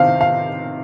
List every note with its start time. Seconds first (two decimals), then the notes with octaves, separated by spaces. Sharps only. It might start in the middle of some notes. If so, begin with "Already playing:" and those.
Already playing: C3 D#3 C4 F5
0.21 F5